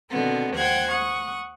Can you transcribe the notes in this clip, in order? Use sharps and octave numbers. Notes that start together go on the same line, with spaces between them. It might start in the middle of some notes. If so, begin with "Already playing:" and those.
B2 D3 D#3 B3 C4
D#2 C5 F#5 G5 F#6 G#6
F#5 C#6 D#6